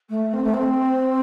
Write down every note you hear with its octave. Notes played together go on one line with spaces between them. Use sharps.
A3
C4
A3
C4